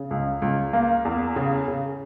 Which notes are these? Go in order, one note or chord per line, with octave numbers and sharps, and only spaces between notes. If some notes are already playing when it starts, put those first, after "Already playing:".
Already playing: C#3
C#2
C#2
A#3
E2
C#3
C#3